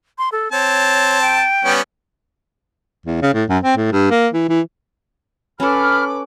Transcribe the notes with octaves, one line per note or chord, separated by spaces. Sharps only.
C6
A4
C4 C#5 A5
G5
G3 B3 C#4
E2
C#3
A2
F#2
C4
A2
G2
A#3
E3
E3
C#4 A4 B4 B5 D6 F6